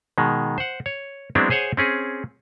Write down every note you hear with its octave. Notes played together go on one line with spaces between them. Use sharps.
B2 D#3 G#3
C5 F#5
C#5
F#3 G#3 B3 C4 D4 E4
G#4 C5 C#5 F#5 G#5
C4 C#4 G#4